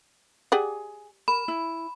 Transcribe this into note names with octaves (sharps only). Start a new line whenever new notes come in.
G4 G#4 D5 F#5 G#5
A#4 B5
E4